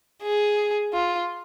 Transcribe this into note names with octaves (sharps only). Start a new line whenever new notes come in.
G#4
F4